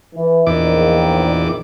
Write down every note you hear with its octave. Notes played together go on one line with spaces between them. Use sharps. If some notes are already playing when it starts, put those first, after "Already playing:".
E3
A#1 E2 D#3 D6